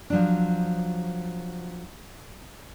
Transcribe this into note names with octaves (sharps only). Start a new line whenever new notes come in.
F3 F#3 D4